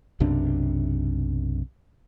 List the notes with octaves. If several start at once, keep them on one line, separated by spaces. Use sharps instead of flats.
B1 F#2 C3 D4